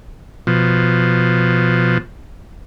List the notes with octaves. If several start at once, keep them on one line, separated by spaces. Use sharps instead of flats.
B2 F3